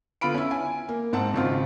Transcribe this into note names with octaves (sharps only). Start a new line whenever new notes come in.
D3 B3 F4 B5 D7
C#4 E4
G#5
A#3
G#2 C4 F#5 A5
G#1 C#3 C4 D#4 F4